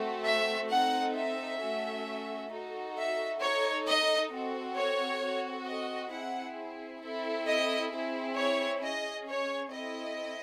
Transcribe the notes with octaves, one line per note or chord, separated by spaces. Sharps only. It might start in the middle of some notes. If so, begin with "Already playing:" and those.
Already playing: A3 C4 F#4 A4
E5
C4 D#4 A4 F#5
E5
A3 C#4 F#4 A4
D#4 F#4 A4
E5
D#4 A4 C#5
D#5
C4 F#4 A4
C#5
C4 F#4 A4
D#5
C4 E4 G#4 F#5
C4 E4 A4
D#5
C4 E4 G#4
C#5
C#4 G#4 D#5
C#5
C4 E4 A4 D#5